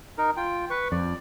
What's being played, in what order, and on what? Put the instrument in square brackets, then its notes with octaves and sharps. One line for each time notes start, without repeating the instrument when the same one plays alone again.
[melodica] D#4 A#4
F4 G5
B4 C#6
[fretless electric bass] F2 [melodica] D5